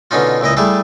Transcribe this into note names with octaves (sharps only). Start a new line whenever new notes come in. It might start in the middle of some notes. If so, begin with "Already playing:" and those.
B2 D3 C#4 D#4 F4
C#2 A#2 E4 D#5
G3 A3 E4 G#4